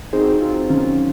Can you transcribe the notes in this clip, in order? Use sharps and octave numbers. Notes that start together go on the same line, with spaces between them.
F#3 C4 D#4 G#4 C5
F#3 C4 F4
D#3 F#3 C#4 F4